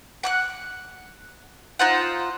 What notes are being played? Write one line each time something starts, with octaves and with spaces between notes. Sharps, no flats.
F#5 D6 F#6
D#4 F4 C5 F#5